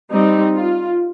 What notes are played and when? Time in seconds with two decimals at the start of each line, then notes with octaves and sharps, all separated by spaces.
0.11 G3 C4 D#4
0.55 F4